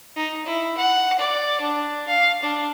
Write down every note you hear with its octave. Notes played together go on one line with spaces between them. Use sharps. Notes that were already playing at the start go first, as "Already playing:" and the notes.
D#4
E4
F#5
D5
D4
F5
D4